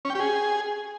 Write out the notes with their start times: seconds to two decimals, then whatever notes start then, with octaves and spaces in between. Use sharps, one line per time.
0.05 C#4
0.10 G5
0.15 G4
0.20 G#4